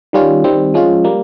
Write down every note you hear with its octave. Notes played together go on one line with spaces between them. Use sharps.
D#3 G3 C#4 F4
D#3 G3 C4
F3 G#3 C#4 F4
G3 A#3